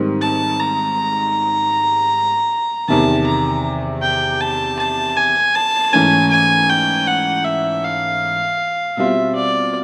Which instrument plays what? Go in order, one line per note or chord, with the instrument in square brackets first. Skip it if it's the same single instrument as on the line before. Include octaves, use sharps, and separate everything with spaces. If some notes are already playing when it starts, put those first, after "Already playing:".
Already playing: [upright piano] G#2 D#3 G3 C4 D#4
[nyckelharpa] A5
A#5
[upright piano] E2 C3 D#3 [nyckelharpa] A5
[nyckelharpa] A#5
G5
A5
A5
G#5
A5
[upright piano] G#2 E3 A3 C#4 [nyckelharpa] G#5
[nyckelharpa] G#5
G5
F#5
E5
F5
[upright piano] B2 G3 C4 F4 [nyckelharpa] E5
[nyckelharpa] D5